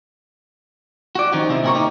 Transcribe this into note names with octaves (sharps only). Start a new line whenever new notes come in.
F#4 D5
D#3 F#3 C4 C#4 D#4 G4
C3 C4 E4 G#4
A#2 D3 C4 F#4 A#4 C#5
D#4 G4